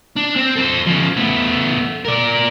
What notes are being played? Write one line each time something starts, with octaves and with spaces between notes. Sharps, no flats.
D4
C4
A4 C5
F3 C#4
A3 B3
A#4 D5